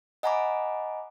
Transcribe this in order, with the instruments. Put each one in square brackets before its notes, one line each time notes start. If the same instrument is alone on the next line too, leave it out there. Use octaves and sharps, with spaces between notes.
[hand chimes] D#5 F#5 G#5 A#5 B5 D6